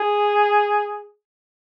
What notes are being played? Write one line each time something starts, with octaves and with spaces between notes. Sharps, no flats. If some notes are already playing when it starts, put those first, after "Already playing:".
Already playing: G#4